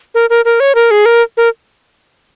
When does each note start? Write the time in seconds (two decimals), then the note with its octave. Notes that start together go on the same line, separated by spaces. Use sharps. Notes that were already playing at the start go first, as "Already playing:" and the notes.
0.15 A#4
0.30 A#4
0.45 A#4
0.60 C#5
0.75 A#4
0.91 G#4
1.06 A#4
1.37 A#4